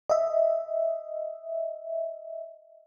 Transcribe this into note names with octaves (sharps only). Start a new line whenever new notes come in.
D#5 E5